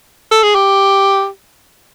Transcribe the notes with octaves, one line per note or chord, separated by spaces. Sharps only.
A4
G#4
G4